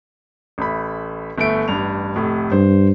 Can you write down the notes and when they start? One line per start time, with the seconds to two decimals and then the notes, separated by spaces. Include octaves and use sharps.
0.58 A1 A3 B5
1.38 G1 A3 D7
1.68 A1 G2 F7
2.16 F1 A2
2.52 G2 C5